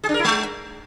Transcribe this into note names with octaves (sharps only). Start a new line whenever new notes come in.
G#4
D4
A#4
E4
G#3